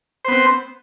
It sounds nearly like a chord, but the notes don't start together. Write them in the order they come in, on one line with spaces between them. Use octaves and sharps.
C5 B3 C4